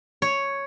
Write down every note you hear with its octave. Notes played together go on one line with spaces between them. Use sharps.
C#5